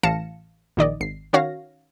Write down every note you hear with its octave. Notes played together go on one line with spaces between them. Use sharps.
A1 F5 A5 A#6 C#7 E7
A#1 D#3 D5 D#5
G#1 C7
D#3 C#4 F#4 C#5 F5 A#6